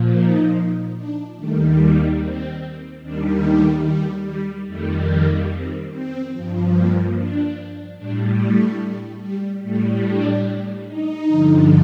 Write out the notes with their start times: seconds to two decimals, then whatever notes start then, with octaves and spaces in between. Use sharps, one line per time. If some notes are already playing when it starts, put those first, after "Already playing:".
Already playing: A#2 F3
0.13 D#4
0.96 D4
1.37 D#2 D#3 G3 A3
1.78 A#3
2.20 C4
3.02 D#2 D#3 G3 D4
3.44 A3
3.85 G3
4.26 G3
4.67 F2 D#3 G3 A3
5.09 A#3
5.50 C4
5.91 C4
6.32 G2 F3
6.74 A#3
7.15 D4
7.98 A2 G3 D4
8.39 A3
9.21 G3
9.63 A2 G3 A3
10.05 D4
10.87 D#4
11.28 G2 D3 F3